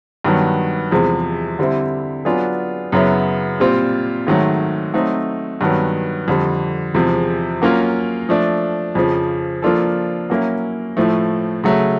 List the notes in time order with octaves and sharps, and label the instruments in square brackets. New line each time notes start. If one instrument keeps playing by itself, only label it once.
[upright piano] G2 D#3 F#3 B3
E2 C3 F3 G#3
D3 G3 C4 E4
F#3 B3 D4 F4 G#4
F#2 C#3 F#3 B3 E4
A#2 G3 C4 F4
G#2 D#3 F#3 A3
F#3 A3 C4 D#4
G2 D#3 F#3 B3
F2 D3 G3
E2 C3 F3 G#3
F#3 A#3 C#4 F4
F3 A3 D4
F2 C#3 F3
F3 A#3 D4 F4 A4
F#3 A#3 C#4 E4
A2 F3 A3
C#3 F#3 A3